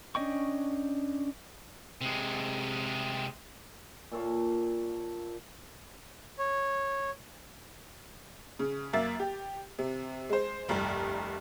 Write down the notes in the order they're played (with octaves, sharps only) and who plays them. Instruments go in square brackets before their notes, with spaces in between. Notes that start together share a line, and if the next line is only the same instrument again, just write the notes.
[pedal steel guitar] C#4 D4 D#5 G5 C#6
[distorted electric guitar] C3 G#3
[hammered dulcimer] A#2 A4 C#5 F5
[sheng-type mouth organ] C#5
[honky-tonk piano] C#3
F#2 A#3 E5 A6
G4
C3
G#3 C5
F1 C2 G2